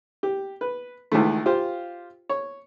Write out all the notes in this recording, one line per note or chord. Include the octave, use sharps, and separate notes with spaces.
G4
B4
C#2 D#3 E3 A3
F4 G4 C5 F5
C#5